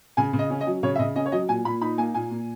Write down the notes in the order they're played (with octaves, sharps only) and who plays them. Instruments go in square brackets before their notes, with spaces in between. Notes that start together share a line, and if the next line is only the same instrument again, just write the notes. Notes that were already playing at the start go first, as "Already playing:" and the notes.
[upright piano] C#3 G#5
C#3
D#5
C#4
D#5
F#3
C#3 C#5
E5
C#3 D#5
C#4 D#5
C#5
F#3 D#5
A#2 G#5
A#2 B5
D#4 B5
A#3 G#5
A#2 G#5
A#2